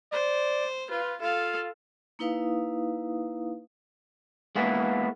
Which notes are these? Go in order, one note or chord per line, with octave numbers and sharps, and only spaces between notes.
C5 D5
F4 B4
F4 A4 F5
A#3 D#4 E4 B4 F5 D#6
G#3 A#3 B3 E4